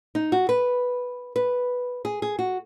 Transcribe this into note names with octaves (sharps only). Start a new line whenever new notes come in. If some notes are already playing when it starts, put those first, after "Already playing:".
D#4
F#4
B4
B4
G#4
G#4
F#4